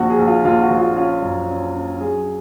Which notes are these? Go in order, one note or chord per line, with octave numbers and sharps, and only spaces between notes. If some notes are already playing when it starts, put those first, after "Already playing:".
Already playing: A#1 D#2 F#4
G#4
A#1
F4
A#1 F4
F#4
A#1
F4
C#4 F4
F#2
C#4
C#4
F#3 G#4